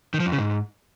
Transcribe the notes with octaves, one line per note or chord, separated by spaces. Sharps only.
D#3
F3
F2
C#3
G#2